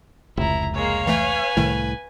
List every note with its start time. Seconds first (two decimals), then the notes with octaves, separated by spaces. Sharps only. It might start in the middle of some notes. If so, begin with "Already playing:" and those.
0.37 F1 C#2 E4 A#5
0.75 G#3 A#3 C#5 F5
1.07 E3 A3 B4 G#5
1.57 C2 A2 D#3